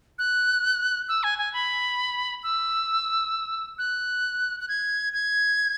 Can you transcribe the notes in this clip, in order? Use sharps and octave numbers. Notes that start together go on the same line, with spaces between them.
F#6
E6
G#5
G#5
B5
E6
F#6
F#6
G#6
G#6